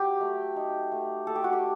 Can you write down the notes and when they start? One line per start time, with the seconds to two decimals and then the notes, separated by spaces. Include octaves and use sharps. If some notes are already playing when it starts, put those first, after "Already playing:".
Already playing: F#3 G4
0.21 A3
0.56 D#4
0.92 A3
1.27 A3 A4
1.36 G4
1.44 F#4
1.53 G4